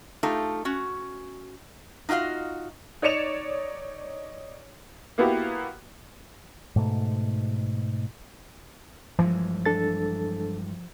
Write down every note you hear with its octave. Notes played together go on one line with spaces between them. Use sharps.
A3 D#4 F4 G4 A4
C#4 F#4
D#4 F4 F#4 D#5 F5
D#4 C#5 D5 C#7 E7 F7
A#3 B3 E4 F#4 G4
G#2 B2 A3
G2 E3 F3 G#3
D4 A4 A6